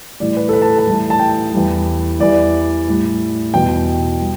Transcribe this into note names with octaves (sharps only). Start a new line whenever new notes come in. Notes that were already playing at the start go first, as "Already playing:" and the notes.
A2 E3 G3 D5
B4
A4
B4
A5
A5
A2 E3 G3
A5
G5
E2 E3 G3
E2 E3 G3 D5
A2 G3
E2 B2 G3 G5
G3